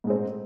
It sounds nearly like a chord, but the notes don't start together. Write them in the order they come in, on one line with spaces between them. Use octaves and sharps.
G#2 G#3 C4 A3